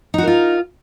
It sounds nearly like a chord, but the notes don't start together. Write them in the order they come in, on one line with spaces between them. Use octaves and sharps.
D#4 F#4 A#4 F4